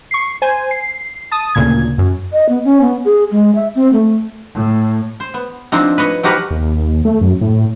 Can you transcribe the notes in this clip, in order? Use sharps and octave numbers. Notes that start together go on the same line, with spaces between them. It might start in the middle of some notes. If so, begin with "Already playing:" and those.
C#6 C7
C5 G#5
C7
A5 D#6
D2 A#2 C#3 G#6
F#2
D#5
B3
C#4
B3
G#4
G#3
E5
C4
A3
A2
C5
B3
F3 C4 D4 D#4
B4 C#5 D#5
F3 D#4 F#4 G4 A#4 B4
D#2
A3
F#2
A2